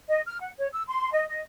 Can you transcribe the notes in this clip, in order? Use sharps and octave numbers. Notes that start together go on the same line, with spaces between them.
D#5
F6
F#5
C#5
E6
C6
D#5
D#5